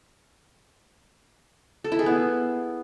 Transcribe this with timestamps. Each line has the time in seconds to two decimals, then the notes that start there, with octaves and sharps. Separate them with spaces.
1.84 A4
1.92 E4
1.99 G#4
2.06 B3